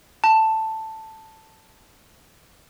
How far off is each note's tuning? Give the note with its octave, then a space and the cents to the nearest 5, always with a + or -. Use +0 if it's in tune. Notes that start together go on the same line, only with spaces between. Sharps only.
A5 +5